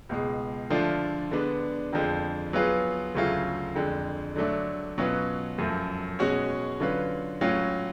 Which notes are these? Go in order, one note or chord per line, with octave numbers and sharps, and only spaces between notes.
C#2 B2 G#3
D3 F3 A3 D4 F4
D3 G#3 B3 D4
F2 D3 F3 G#3
F#3 B3 F4 G#4 B4
D2 C#3 F#3 A3 F4
F2 D3 G#3
D3 F#3 A3 D4
B2 F#3 C#4 F4 B4
F#2 F3 A3
B2 G#3 C#4 F#4 C#5
D3 F#3 C#4 F4 B4
A2 F#3 C#4 F4